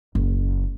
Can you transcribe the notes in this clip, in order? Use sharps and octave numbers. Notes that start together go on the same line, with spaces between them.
F#1